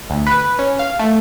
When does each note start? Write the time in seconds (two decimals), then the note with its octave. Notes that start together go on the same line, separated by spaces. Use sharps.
0.10 D2
0.27 B4
0.59 C#4
0.79 F5
0.99 A3